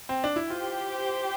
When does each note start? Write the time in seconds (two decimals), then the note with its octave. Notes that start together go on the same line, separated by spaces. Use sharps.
0.09 C4
0.24 D4
0.36 E4
0.50 F4 G4 C5 G5